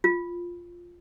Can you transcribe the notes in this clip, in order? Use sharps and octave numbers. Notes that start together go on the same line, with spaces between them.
F4